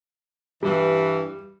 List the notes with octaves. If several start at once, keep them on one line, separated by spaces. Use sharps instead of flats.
G2 E3 G3